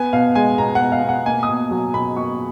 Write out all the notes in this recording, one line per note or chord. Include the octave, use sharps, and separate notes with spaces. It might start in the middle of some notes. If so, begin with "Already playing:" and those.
Already playing: B3 G#5
B2 F5
G#3 G#5
B2 A#5
F#5
B3
F5
B2
F#5
A#3 G#5
D#6
B2
F#3
B2 B5
A#3 C#6